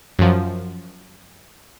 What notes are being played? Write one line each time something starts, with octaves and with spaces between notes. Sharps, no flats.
F#2 F3